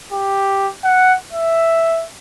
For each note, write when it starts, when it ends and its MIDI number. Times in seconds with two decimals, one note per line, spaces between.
0.12 0.68 67
0.84 1.14 78
1.33 2.04 76